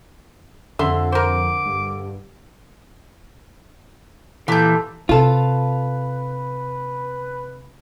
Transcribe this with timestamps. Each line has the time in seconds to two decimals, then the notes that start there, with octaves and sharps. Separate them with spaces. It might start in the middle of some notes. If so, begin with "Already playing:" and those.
0.79 F2 D3 E5 C6
1.12 A#4 C5 D6
1.66 G2
4.48 A#2 E3 G4 A4 G6
5.09 C3 F4 A4 B4